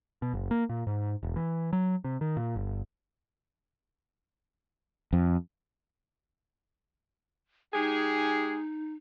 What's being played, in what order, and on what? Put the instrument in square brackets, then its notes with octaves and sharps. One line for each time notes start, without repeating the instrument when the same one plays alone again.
[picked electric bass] B2
F#1
A#3
A#2
G#2
E1
E3
F#3
C3
D#3
A#2
G1
[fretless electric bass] F2
[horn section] G#3 G4 G#4 [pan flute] D#4